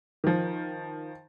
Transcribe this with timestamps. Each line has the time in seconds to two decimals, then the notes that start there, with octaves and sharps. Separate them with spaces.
0.24 D#3 F3